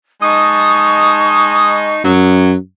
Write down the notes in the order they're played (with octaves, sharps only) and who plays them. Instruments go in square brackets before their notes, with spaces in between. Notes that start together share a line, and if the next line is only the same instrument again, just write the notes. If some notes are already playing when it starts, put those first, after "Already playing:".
[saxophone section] G#3 D#4 [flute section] A5 C#6 [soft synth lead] D#6
[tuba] F#2 [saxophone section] F#3